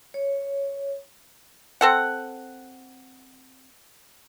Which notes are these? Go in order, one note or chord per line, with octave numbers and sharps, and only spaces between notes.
C#5
C4 A4 F#5